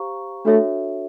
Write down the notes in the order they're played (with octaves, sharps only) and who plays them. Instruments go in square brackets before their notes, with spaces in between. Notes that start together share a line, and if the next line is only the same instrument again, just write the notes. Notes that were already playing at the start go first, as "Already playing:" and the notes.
Already playing: [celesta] G4 C5 F5 A#5 C#6
[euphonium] A3 [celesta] D4 F#4 A4 C#5 E5